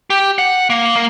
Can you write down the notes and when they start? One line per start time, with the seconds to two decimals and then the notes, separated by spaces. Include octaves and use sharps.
0.10 G4
0.38 F#5
0.70 A#3
0.96 A#3